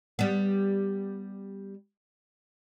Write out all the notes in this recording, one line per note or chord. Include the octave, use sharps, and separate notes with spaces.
G3 B3